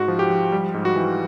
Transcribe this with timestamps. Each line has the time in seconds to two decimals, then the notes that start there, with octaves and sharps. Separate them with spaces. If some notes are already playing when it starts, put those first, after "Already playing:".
Already playing: G#2 F#4
0.08 F3
0.19 G4
0.30 F3
0.52 G3
0.74 G#2
0.85 F#4
0.96 E3